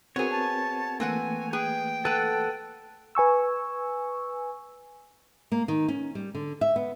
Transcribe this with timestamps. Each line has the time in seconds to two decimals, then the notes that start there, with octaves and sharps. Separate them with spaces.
0.16 B3 C4 F#4 G#4 A#4 C#5
0.31 A5
1.00 E3 A3 A#3 C4 B4 F#5 G#5
1.53 G#4 B4 G5
2.05 A4 B4 F#5 A5
3.15 B4 G#5 C#6 E6
5.52 A#3
5.68 D#3
5.88 C#4
6.15 G3
6.35 D3
6.61 E5
6.76 B3